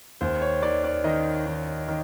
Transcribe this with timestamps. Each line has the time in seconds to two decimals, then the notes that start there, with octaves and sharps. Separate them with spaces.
0.21 D#2 C5
0.42 C#5
0.62 D#3 D5
0.84 D5
1.04 D#3 D#5
1.46 D#3
1.88 D#3